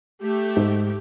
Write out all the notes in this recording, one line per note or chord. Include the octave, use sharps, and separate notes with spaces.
A3 G4
G#2